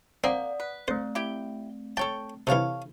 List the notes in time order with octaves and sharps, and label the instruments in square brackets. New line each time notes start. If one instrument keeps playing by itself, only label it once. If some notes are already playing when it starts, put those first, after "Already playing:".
[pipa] A#3 [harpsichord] C4 [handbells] D5 F#5 D#6
[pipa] B4
[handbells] A3 C4 [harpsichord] C5
[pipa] E4 G4 G5
[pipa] A4 C#5 G5 [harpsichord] A5
[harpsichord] C3 E3 [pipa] A4 C#5 F5